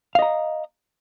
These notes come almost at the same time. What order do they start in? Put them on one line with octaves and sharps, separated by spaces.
F5 D#5 A#5